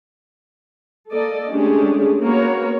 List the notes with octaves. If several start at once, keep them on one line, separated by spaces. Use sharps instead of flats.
A#3 A4 D5 D#5
G#3 A3 C#4 D4 G4 G#4
A#3 B3 F#4 A#4 C#5